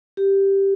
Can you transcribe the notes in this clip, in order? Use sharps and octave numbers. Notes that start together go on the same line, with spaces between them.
G4